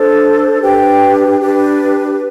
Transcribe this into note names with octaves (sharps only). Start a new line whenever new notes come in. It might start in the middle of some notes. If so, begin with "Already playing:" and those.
Already playing: D4 A4 C5
D4 G4 B4 G5
D4 G4 B4